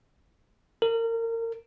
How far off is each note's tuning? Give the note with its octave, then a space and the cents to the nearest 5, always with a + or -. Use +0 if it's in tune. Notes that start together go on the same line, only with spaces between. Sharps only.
A#4 -30